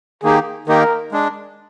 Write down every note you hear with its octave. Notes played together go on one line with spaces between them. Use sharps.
D#3 A#3 D#4 G4 G#4
D#3 A#3 D#4 G4 A#4
G#3 D4